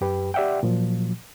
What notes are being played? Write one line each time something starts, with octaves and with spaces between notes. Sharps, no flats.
F#2 G4 B4
G4 D5 E5 F#5 G5
A#2 F3 F#3